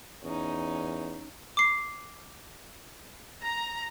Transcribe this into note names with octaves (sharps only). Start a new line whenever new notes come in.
E2 C#4 D#4
D6 C7
A#5